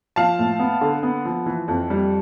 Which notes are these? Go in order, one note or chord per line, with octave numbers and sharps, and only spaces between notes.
F3 F5 A5
A2
B3
D3
B3
F3
E3
F2
G3